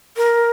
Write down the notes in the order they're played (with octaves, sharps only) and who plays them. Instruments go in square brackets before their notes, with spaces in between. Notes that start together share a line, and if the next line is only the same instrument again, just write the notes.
[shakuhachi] A#4